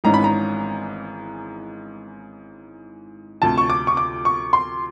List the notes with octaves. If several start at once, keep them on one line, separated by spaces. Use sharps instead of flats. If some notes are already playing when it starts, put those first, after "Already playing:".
G#1 G#2 E3 G#3 C#4 A#5
B5
A#5
D2 C3 F3 A5
C#6
D6
C#6
D6
C#6
C6